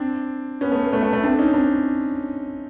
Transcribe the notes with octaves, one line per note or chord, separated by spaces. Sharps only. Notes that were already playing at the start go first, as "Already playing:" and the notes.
Already playing: C4 D4
B3 C#4
A3 B3
A#3
A3 B3
A3
A3
C4 D4
C#4 D#4
C4 D4